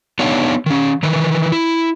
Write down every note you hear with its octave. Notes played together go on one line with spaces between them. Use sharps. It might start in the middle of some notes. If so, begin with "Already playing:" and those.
B3 D4 D#4 G4 C#5 F5
D#3 C#4
D#3 E3 B4
E4